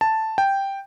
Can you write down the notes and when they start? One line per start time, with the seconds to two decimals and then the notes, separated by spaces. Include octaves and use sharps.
0.01 A5
0.38 G5